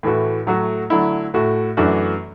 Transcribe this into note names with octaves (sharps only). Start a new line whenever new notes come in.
A2 E3 A3 F#4
A2 F#3 A3 F#4
D3 F#3 A3 E4
A2 A3 F#4
F#2 E3 A3 D4 F#4